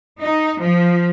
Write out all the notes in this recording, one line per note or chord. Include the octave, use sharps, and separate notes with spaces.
D#4
F3